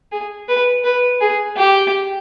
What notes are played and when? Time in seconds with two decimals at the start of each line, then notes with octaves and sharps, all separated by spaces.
0.12 G#4
0.48 B4
0.84 B4
1.21 G#4
1.57 G4